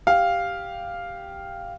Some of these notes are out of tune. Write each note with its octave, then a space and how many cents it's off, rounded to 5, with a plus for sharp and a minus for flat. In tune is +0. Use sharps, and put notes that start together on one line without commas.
G4 +0 F5 +0